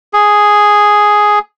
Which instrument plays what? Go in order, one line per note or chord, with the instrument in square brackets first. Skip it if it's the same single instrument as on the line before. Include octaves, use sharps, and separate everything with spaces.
[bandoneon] G#4